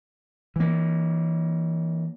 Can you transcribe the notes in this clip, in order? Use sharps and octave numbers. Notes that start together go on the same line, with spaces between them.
E3 A#3